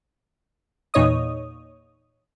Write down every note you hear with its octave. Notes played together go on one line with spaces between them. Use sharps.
E2 A#2 D#4 C#5 D#5 D#6